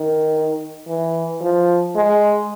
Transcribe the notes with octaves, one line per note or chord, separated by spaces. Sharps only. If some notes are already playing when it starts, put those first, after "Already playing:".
Already playing: D#3
E3
F3
G#3